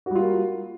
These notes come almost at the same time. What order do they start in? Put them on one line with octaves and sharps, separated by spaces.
F#4 G3 F4 A#3